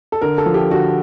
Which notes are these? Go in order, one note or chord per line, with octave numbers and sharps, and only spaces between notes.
A4
D3 A#4
A4
F3
G4
D3 F#4